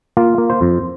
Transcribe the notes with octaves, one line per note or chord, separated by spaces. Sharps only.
A#3 F4
A#3
C5
F2